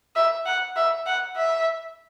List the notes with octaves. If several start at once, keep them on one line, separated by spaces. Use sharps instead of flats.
E5
F#5
E5
F#5
E5